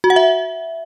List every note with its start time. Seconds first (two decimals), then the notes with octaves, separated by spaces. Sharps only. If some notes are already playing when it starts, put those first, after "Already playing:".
0.04 F#4
0.10 F#5
0.16 E5